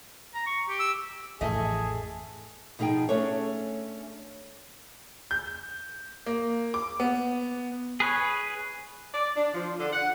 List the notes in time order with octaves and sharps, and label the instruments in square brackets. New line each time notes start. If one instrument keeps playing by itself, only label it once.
[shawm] A#5
C#6
G4
[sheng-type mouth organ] E6
[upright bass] A1 A2 [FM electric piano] F2 E3 [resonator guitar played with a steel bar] A3 D#5 [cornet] G#4
[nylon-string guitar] B2 F3 D#4 G#4 G5
A3 C#4 D4 G#4 A4 C#5
[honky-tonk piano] G6
A#3
D6
B3
[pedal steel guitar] G#4 B4 C#5
[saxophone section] D5
D4
F3
D3
F#5